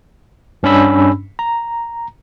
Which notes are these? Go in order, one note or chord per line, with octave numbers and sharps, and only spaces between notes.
G2 C#4 D4 B5 E6
A#5